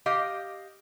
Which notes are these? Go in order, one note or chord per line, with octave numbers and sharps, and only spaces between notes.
G4 D#5 F5